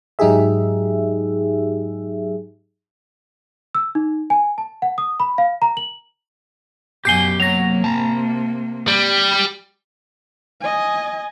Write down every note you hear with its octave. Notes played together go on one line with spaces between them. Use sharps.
G#2 F#3 D#4 G4 G#4 E5
E6
D#4
G#5
A5
F#5
D#6
B5
F5
A#5
F#7
F#2 B2 G4 G#5 G6 C7 G7
C3 F#3 A#3 A#6 F7
A5 A#5
G3
D#5 G#5